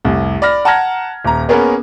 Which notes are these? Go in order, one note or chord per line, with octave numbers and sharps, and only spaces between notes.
F1 C2
D5 B5 F6 A#6
F#5 A5 A#5 F6 G#6 A#6
D#1 A#5
A#3 B3 C#4 G#4 A#4 B4